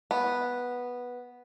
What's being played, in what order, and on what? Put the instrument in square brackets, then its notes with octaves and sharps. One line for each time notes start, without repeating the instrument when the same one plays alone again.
[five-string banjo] B3